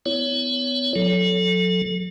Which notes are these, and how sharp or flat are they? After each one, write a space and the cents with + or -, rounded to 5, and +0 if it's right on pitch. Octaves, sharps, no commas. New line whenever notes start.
B3 +35 E4 +0 C#5 +20
F#3 -35 A4 +0